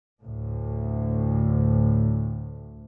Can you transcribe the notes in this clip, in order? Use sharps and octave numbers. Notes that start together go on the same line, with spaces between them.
D2 A2